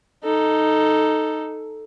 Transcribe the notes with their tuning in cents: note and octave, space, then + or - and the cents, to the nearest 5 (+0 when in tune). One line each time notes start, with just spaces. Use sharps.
D#4 +0 A4 +0